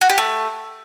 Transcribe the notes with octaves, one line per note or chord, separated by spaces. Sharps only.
F#4
G4
A3